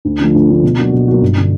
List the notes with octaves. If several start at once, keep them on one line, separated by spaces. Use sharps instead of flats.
D2
D3 F3 A3
D2
D3 F3 A3
B2
F#3 A#3 D4 F#4
B2
F#3 A#3 D4 F#4
G1
D3